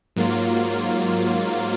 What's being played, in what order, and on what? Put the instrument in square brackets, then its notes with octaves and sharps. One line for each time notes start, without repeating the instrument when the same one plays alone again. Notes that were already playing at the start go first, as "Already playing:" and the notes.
[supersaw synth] G#2 F#3 A#3 F4